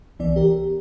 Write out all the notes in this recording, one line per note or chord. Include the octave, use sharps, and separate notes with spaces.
C2 E3 B3 D5
G4 A#4